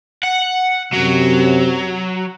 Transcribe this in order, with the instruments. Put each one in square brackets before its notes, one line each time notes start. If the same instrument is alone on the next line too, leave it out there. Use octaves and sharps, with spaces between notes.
[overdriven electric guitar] F#5
[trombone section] F#2 C3 [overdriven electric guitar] F#3